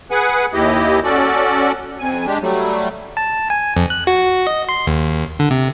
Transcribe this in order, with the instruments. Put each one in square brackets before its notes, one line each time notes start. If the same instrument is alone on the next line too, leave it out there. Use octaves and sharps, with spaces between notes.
[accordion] G#4 B4 F#5 G#5
D#2 E4 G4 D#5
C#4 F#4 A4 D5
F2 G#5
G#3 D4 G4
F#3 G3 A3
[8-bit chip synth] A5
G#5
F2
F#6
F#4
D#5
C6
D#2
D3
C3